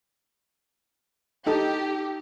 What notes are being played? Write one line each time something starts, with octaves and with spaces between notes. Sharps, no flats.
D#4 G4 A4